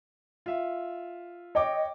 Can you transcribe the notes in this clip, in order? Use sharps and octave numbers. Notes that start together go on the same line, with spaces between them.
F4 E5
C#5 D#5 G5 D6